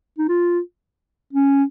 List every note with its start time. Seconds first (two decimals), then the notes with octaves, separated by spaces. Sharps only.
0.18 D#4
0.28 F4
1.33 C#4